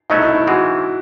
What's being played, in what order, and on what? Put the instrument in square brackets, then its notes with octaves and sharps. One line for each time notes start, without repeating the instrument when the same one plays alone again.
[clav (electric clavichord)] C2 B2 F#3 A3 C#4 [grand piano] D#4
[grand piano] E4
D#4
E4
[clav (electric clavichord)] C#3 E3 G#3 C4 [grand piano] F#4